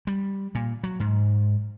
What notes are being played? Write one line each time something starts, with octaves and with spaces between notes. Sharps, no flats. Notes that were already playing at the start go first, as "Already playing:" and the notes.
G3
A#2
F#3
G#2